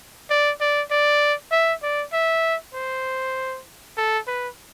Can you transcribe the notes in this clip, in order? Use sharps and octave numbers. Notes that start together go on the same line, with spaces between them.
D5
D5
D5
E5
D5
E5
C5
A4
B4